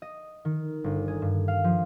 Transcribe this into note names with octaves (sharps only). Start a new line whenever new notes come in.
D#5
D#3
G1
G#4
G2
F5
F3